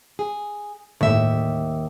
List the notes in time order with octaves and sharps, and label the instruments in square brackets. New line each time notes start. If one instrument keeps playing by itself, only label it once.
[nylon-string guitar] G#4
[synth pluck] G1 A2 [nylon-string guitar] D#2 E5